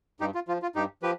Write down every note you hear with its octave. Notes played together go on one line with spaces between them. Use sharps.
G2 D#4 G4
F4
F3 F4
F4
G2 D#4 G4
F3 G4 B4